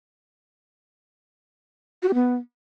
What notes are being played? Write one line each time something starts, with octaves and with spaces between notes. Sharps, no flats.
F#4
G4
B3